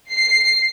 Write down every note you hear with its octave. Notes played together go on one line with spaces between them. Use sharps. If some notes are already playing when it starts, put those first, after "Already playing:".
C7